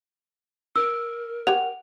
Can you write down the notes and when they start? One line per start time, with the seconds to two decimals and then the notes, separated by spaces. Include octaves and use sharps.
0.76 A#4 E6
1.47 G4 C#5 F#5 F7